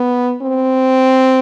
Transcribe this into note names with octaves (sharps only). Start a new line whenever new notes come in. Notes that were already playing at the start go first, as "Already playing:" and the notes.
Already playing: B3
C4